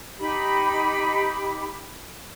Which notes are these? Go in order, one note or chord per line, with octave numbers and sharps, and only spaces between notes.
D#4 G4 B5